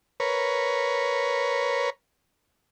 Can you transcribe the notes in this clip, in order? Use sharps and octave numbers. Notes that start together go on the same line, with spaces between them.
A#4 B4 C#5